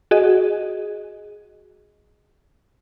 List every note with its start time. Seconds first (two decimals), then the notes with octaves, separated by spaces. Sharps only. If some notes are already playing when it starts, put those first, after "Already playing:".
0.11 F#4 G#4 D#5